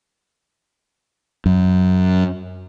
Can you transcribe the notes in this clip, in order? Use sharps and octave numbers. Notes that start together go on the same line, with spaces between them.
F#2